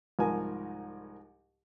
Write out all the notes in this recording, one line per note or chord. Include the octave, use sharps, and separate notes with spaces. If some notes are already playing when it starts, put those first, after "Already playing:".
C2 G#2 F3 A#4 G#5